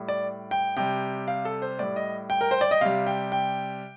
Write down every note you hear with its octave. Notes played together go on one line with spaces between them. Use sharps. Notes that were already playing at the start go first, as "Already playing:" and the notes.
Already playing: A2 G3
D5
G5
C3 G3 G5
F5
A4
C5
A2 G3 D5
D#5
G5
A#4
C5
D5
D#5
C3 G3 F5
G5
G5